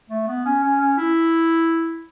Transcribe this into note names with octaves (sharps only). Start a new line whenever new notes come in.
A3
B3
C#4
C#4
C#4
E4